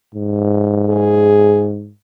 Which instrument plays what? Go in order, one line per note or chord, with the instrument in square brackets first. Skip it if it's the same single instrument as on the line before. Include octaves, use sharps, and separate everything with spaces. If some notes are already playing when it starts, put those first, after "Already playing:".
[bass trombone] G#2
[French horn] G#4